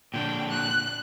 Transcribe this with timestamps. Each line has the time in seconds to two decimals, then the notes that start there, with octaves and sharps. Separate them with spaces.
0.14 A#2 D3 D4 G5
0.51 F#6